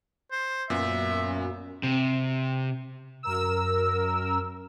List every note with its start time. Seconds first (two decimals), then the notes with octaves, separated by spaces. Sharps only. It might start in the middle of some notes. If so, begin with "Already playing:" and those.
0.31 C5
0.70 F#2 A#2 B3 E5
1.83 C3
3.23 F#2 A#4 E6